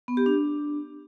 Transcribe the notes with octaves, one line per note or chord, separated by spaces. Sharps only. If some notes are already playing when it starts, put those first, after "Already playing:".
B3
G4
D4